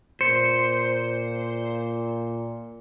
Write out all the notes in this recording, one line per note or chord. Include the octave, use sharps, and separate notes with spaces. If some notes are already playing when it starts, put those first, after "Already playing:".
A#2 C5 C#7